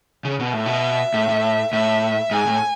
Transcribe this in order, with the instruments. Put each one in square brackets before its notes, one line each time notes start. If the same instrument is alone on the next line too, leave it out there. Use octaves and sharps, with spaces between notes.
[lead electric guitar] C#3
B2
[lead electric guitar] A2 [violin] E5
[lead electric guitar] B2
A2
A2
[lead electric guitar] A2 [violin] E5
[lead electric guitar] G#2 [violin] G#5
[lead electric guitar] A2